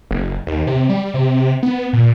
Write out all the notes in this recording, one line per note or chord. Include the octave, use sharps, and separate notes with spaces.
F#1
D#2
C3
G3
C3
B3
A#2